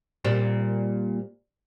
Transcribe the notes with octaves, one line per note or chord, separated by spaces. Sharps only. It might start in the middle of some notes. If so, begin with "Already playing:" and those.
A#2 G3 C4